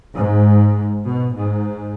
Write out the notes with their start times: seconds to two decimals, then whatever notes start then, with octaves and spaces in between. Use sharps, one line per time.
0.16 G#2
1.06 B2
1.35 G#2